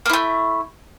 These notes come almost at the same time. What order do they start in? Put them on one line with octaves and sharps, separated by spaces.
A#3 E4 A3